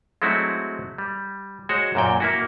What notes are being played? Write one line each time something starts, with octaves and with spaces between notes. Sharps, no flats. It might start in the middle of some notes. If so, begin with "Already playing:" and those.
F#3 G#3 A3 C4 E4 F#4
G3
G#3 F#4 C5 C#5
F#2 A#2 G5
A#3 E4 F#4